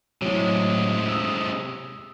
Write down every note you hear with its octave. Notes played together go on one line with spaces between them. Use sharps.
A2 C3 F#3 G#3
D#6 E6